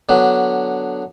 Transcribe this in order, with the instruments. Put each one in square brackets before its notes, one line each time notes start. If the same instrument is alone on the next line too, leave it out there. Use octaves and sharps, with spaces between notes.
[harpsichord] D3 F#3 B3 D4